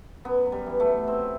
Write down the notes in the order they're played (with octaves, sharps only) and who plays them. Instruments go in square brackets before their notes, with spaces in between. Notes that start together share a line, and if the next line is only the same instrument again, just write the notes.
[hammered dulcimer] F#2 B3
F#2
G3
E3
A3
E3
F#2 C4